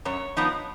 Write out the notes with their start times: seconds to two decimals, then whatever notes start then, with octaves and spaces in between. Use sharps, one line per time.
0.05 F#2 C#5
0.37 F3 B3 D#4